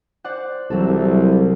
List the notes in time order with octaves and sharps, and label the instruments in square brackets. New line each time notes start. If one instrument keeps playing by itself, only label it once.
[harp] C5 D5 F#5
[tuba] C2 [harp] E3 F#3 A4